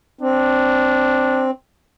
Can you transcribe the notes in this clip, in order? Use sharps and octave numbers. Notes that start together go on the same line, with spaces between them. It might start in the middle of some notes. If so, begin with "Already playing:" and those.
C4 D4